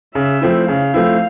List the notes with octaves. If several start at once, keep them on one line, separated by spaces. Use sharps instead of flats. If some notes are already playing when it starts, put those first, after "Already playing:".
C#3 E5
F3 A3 C4 E4
C#3 F5
F3 A3 C4 E4